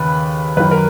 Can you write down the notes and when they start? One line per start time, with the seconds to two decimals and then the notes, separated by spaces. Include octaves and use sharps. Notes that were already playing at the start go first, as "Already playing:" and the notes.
Already playing: D#2 C#3 B4
0.57 F#2 D#3 B4
0.71 A#4